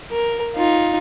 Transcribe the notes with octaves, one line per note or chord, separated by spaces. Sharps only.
A#4
D#4 F4